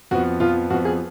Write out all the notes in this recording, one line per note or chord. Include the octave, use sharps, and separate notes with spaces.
F2 F3 B3 F#4
F2 F3 B3 F4
F2 F3 B3 F#4
G#4